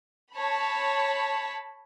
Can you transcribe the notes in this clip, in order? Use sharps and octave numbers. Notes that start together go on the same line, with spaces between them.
C#5 A5 B5